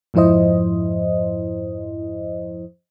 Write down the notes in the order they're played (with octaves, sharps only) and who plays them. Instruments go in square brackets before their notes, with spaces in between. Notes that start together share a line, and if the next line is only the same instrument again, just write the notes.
[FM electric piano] F2 G#2 F3 E4 C5 D#5